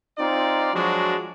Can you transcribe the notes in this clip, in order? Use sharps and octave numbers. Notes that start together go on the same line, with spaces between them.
C4 D#4 F4 D5 A#5
F3 F#3 G#3 D4 F#4